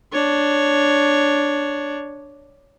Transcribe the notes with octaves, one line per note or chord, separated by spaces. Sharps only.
D4 C#5